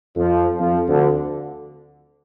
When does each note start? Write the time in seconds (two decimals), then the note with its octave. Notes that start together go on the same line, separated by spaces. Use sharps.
0.16 F2 F3
0.59 F2 F3
0.88 D2 D3